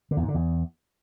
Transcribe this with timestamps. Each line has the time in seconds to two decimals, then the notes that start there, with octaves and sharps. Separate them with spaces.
0.11 D3
0.17 E2
0.23 G#2
0.28 D3
0.34 E2